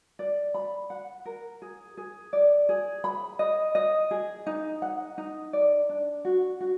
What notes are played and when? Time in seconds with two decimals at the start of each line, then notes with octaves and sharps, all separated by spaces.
0.19 D5
0.54 B5
0.90 F#5
1.25 A#4
1.62 G#4
1.97 G#4
2.33 D5
2.69 G#4
3.04 B5
3.39 D#5
3.75 D#5
4.11 G#4
4.47 D#4
4.82 F#5
5.18 D#4
5.53 D5
5.89 D4
6.25 F#4
6.61 F#4